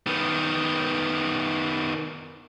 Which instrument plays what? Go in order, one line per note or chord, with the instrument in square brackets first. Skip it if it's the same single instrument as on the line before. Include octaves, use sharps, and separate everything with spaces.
[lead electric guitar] D#3 B3